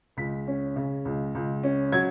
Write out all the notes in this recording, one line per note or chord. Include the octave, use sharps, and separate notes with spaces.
C#2 B6
C#4
C#3
C#2
C#2
C#4
F#3 G#6